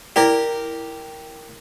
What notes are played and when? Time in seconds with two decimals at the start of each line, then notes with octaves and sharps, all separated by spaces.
0.16 E4 G4 A#4 D5